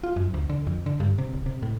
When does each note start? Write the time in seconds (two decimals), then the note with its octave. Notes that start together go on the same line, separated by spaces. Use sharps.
0.04 F4
0.16 F#2
0.34 D2
0.49 D3
0.67 F2
0.86 D3
1.00 G2
1.18 C3
1.34 D1
1.46 C3
1.63 A2